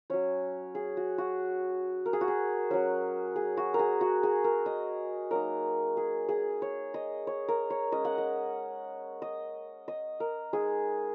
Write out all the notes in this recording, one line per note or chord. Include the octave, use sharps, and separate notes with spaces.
F#3 C#4 C#5
G#4
F#4
F#4
A#4
G#4
F#4
G#4
F#3 C#4 F#4
G#4
F#4
A#4
G#4
F#4
G#4
A#4
D#5
F#3 A#3 D#4 A#4
G#4
G#4
C#5
D#5
C#5
A#4
C#5
G#3 C#4 D#5
F#5
D#5
D#5
D#5
A#4
G#3 D#4 G#4